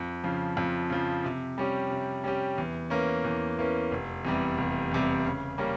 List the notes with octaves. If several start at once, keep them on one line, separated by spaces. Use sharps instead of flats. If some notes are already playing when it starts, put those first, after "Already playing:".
Already playing: F2
C#3 F3
F2
C#3 F3
C3
G3 C#4 G4
C3
G3 C#4 G4
E2
E3 A#3 C#4
E2
E3 A#3 C#4
F1
E2 C3 G3
F1
E2 C3 G3
C#3
G3 A#3 C#4